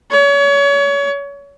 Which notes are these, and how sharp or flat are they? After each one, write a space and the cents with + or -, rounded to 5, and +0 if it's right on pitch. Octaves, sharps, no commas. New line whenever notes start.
C#5 +30